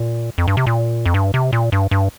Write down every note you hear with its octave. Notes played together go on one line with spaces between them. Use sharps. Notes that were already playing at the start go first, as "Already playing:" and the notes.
Already playing: A#2
F2
G2
C3
A#2
F2
G2
C3
A#2
G2
G2